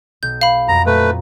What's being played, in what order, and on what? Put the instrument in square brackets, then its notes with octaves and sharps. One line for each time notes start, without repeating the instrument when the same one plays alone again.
[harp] B1 [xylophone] G6
[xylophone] F5 B5
[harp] F2 F#3 D7 [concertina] A#5
[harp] A#2 A#5 [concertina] A3 B4